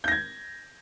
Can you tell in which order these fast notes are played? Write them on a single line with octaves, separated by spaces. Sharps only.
G6 A#6 G#6